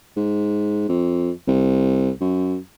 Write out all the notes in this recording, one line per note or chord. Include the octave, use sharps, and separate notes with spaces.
G#2
F2
C2
F#2